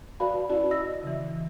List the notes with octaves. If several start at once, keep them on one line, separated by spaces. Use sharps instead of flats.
F#4 B4 D5 F5 A5 B5
C#4 E4 F#4 D5 A5
D#5 E6 A#6
C#3 E3